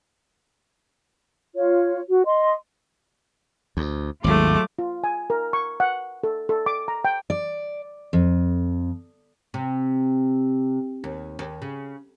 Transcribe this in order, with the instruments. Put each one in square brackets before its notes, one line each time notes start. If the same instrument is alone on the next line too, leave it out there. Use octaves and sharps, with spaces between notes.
[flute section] F4 C#5
F#4
D#5 C6
[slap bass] D2
[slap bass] G#1 D#2 [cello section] F#3 G#3 F4 [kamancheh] A3 D6
[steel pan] F4
G#5
A#4
C#6
F#5
A4
A4
D6
A#5
G5
[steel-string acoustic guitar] D5
F2
[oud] C3
D#2
D#2
C#3